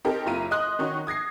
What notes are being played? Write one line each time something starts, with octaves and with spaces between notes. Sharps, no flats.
C4 D#4 G4 A4 A#4
F#1 E4 F4 A#5 D#7
D#5 C6 D#6 F#6
D#3 C#4 D#4 F#4
D#6 G#6 A#6 C7